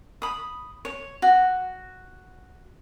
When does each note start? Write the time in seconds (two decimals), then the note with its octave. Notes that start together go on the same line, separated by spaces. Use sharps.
0.22 B5 D#6
0.85 C#5
1.22 F#4